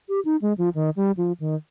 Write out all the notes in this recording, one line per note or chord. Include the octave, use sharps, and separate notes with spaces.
G4
D#4
G#3
F3
D#3
G3
F3
D#3